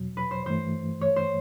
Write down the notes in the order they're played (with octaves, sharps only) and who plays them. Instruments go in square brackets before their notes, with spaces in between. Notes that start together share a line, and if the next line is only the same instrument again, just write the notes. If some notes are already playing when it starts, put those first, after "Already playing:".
Already playing: [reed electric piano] E2 B2 F#3
[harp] B4
C5
[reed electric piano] G2 E3 A3 [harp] C5
[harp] C#5
C5